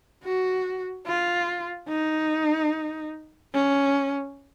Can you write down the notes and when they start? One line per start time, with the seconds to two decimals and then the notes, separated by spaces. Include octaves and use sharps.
0.25 F#4
1.07 F4
1.89 D#4
3.53 C#4